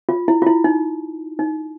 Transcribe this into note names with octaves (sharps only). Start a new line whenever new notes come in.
F4
E4
F4
E4
D#4
D#4